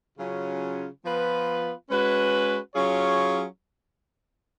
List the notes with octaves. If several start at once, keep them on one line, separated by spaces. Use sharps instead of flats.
C#3 F#3 C#4 F4
F3 B3 F4 B4
G#3 C#4 F#4 B4
F#3 C#4 F4 G#4 C#5